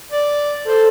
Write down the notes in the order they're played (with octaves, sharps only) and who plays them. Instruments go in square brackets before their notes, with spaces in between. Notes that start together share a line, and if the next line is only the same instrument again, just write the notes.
[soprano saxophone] D5
[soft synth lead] A4 [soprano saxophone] C5